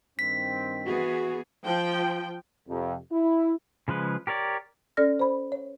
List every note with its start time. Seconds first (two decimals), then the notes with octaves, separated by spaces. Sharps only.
0.19 G2 D#3 C4 B6
0.86 E3 B3 F#4 G#4
1.64 F3 G5
2.69 F2 C3
3.12 E4
3.88 C#3 F3 G#3 B4
4.27 G4 A#4 C#5 D5
4.97 C#4 A4 D5 F6 A#6
5.20 C5 B5
5.52 C#5